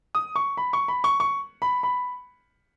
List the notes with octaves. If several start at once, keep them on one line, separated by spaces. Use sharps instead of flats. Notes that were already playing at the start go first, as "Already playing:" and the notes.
D#6
C#6
B5
C#6
B5
C#6
C#6
B5
B5